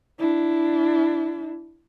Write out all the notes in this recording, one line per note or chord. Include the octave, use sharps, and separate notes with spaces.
D4 E4